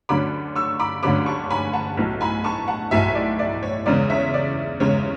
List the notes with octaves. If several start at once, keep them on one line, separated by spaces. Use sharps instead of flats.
D2 D3 F#3 C#4 B5 D6
C#6 E6
B5 D6
D2 D3 F#3 C#4 B5 D6
A5 C#6
G#5 B5
F#5 A5
B1 A2 F#3
G#5 B5
A5 C#6
F#5 A5
B1 A2 F#3 E5 G#5
D5
D5
C#5
E2 C#3 G#3 C#4 D5
C#5 E5
D5
E2 C#3 G#3 C#4 C#5